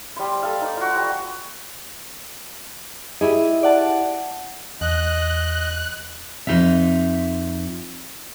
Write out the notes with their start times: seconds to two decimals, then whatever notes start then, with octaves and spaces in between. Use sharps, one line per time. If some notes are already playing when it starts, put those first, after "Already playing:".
0.16 G3 C6
0.43 A4 F5
0.61 D#4 D5
0.77 F4 F#4
0.95 G3
3.21 E4 G4 G#4 D#5
3.63 D5 F#5 A5
4.81 E2 D#5 F#6
6.47 F2 E3 D#4 F4 E5